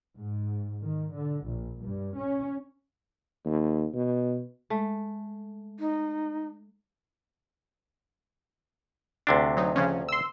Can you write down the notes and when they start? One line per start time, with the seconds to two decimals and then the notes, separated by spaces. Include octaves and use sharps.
0.14 G#2
0.83 D#3
1.13 D3
1.46 A#1
1.82 G2
2.16 C#4
3.46 D#2
3.94 B2
4.70 G#3 A3
5.80 D#4
9.27 D2 C3 D4
9.57 F#3 D#4
9.76 C#3 F3 C#4
10.09 C6 E6